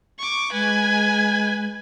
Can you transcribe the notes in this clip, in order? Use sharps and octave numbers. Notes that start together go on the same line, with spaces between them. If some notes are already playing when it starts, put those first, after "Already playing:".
C#6 D6
G#3 B4 G#5